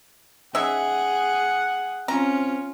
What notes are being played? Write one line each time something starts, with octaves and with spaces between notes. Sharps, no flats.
C#4 D#4 G#4 E5 F#5
C4 C#4 F4 A#5